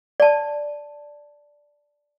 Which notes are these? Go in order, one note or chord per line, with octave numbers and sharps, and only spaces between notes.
D5 A5